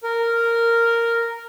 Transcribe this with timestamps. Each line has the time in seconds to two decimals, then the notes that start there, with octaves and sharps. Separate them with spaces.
0.03 A#4